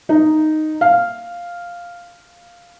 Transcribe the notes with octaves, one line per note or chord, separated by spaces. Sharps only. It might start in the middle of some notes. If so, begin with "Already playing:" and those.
D#4
F5